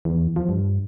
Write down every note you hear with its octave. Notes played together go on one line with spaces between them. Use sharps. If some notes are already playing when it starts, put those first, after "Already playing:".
E2
F3
G2